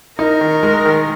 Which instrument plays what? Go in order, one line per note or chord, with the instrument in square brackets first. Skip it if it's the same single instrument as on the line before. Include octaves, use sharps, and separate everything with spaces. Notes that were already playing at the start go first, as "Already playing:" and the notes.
[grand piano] D#4 [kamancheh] A#4
[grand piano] D#3
G#3
D#3